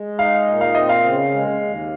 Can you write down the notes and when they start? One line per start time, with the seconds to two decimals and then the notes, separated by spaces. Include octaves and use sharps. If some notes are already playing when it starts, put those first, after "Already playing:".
Already playing: G#3
0.19 D#4 F5
0.47 A#2
0.61 F5
0.75 C4 D#5
0.89 F5
1.03 C#3
1.32 G#3
1.61 D#2